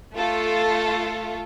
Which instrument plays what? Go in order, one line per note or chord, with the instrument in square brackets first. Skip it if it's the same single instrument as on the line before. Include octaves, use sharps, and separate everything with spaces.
[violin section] A3 F4 A4